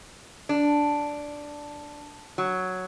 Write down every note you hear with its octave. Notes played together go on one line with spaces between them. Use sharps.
D4
F#3